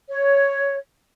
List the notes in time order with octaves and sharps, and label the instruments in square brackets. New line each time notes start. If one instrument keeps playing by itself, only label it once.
[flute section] C#5